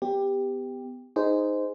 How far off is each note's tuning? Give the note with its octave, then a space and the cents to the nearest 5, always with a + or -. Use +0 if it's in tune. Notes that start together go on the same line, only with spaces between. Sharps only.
B3 +25 G4 +10
D#4 +0 G#4 +0 C5 -15